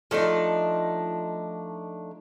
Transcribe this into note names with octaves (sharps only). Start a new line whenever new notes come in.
F3 A3 D4 D#4